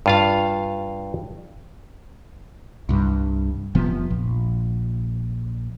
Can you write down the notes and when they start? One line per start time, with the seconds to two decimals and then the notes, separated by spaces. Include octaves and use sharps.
0.06 G2 F4 F5
2.89 C2 G2
3.75 F1 C3 F3 B3
4.10 A#1